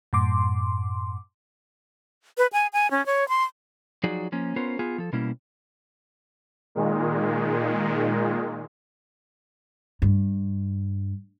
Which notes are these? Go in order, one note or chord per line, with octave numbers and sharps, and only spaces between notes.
F#2 A2 C6 D6
B4
G#5
G#5
C#4
C#5
C6
F3 F#3 D#4 F#4 G#4 D5
F3 A#3 C#4
B3 C#4 F4 A#4 C5
B3 F4 G#4
F3 A4
B2 G3 A#3 C#4 E4
A#2 D#3 G#3
G2